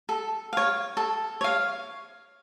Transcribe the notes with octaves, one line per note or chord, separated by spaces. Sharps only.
A4
C#5 F5
A4
C#5 F5